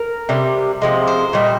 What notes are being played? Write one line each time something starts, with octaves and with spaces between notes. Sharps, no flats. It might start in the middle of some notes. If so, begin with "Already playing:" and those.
Already playing: A#4
C3 G3
C3 F3 G#3
C5
A#2 G3 D#5